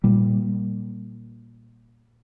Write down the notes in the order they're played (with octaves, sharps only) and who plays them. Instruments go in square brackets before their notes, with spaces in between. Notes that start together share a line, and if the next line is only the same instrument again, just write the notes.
[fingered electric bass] A#2 G3